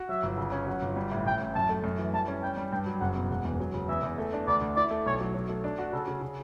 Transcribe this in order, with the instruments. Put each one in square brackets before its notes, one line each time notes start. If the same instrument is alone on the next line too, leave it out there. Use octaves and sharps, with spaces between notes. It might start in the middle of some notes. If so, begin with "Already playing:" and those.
Already playing: [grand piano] F#4
[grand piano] F#3 [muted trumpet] E5
[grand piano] G1
C#3
C#4
[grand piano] F#3 [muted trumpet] F#5
[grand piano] G1
G3
A2
[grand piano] A1 [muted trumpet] G5
[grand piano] A1
[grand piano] F#2 [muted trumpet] A5
[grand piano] A3
F#2
E3
[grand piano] G3 [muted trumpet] A5
[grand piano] C#4
[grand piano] G3 [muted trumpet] G5
[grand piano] G3
[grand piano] G2 [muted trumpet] G5
[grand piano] F#3
[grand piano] F#1 [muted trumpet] F#5
[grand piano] B2
[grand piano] E1 [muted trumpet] F#5
[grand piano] E2
F#3
C#3
[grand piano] E2 [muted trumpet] E5
[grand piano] E2
A3
D4
[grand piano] D2 [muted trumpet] D5
[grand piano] D2
[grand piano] E4 [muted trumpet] D5
[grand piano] A3
[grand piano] B1 [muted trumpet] C#5
[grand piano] F#3
F#3
A3
D4
F#4
[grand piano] C#3 [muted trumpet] A4
[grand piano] C#3
C#3